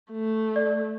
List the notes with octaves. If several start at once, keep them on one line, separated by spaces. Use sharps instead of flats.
A3
D5